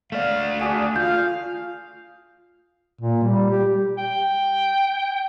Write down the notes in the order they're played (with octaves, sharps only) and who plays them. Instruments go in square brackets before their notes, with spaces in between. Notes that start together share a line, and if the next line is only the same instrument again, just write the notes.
[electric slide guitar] A3 D5 [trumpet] F5
[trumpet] D4 [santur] F#4 G#4 D6
[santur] F4 [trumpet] F5 [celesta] G6
[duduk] A#2
G3
G4
[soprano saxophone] G5